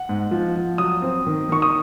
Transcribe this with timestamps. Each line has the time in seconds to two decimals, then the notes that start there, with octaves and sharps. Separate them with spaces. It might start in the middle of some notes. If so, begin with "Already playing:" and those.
Already playing: F#5
0.09 G#2
0.31 F3
0.56 F3
0.78 F#3 D#6
1.02 C4
1.26 D#3
1.49 D#3 C#6
1.62 D#6